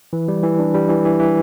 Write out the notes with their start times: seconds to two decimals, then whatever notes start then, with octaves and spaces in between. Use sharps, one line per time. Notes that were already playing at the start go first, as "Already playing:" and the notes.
0.13 E3
0.28 G3
0.43 E3
0.59 D4
0.74 G3
0.89 E3
1.05 E3
1.20 E3